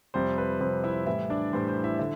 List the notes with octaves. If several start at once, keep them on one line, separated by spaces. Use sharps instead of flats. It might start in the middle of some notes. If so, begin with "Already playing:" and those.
F2 C3 G3 C5
B4
F2 C3 G3 C5
E4 E5
A2 E3 G3 E4 E5
D4 D5
A2 E3 G3 C5
C5
E4 E5
D3 E4 E5